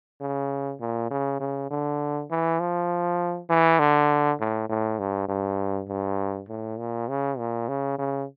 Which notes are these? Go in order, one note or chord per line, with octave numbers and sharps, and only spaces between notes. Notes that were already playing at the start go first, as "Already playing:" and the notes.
C#3
A#2
C#3
C#3
D3
E3
F3
E3
D3
A2
A2
G2
G2
G2
A2
A#2
C#3
A#2
C#3
C#3